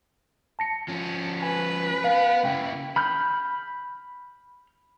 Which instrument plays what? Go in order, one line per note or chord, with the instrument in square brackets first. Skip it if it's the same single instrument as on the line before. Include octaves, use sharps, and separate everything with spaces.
[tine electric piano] A5 A#6 C#7
[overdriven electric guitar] F3 C#4
[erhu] B4 [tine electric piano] G#5
[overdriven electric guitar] B3 [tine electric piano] F5
[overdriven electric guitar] C#3 A#3 [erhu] E4 [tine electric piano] G5
[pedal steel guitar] B5 F6 G6